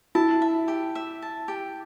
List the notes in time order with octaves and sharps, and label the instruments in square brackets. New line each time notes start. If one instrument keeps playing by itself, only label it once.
[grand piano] E4 [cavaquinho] A5
[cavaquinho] E5
G4
E5
A5
G4